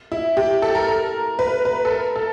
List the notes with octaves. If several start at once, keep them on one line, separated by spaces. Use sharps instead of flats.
E4
G4
A4
A#4
A#4
B4
B4
A4
A#4
A4